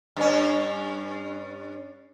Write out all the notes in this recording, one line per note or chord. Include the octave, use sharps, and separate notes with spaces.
G2 C#4